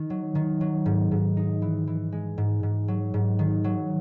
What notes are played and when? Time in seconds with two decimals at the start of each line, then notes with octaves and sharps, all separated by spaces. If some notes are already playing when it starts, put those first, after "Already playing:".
Already playing: D#3
0.10 F#3
0.35 D#3
0.61 F#3
0.86 G#2
1.11 G#2
1.37 D#4
1.62 E3
1.87 E3
2.12 G#3
2.38 G#2
2.63 G#2
2.88 F#3
3.14 G#2
3.39 D#3
3.64 F#3